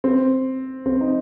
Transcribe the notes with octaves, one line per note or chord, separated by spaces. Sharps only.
C4
C4
D#4